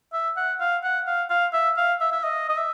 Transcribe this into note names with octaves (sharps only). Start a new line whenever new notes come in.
E5
F#5
F5
F#5
F5
F5
E5
F5
E5
E5
D#5
D#5
E5